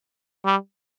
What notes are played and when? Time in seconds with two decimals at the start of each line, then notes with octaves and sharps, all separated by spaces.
0.45 G3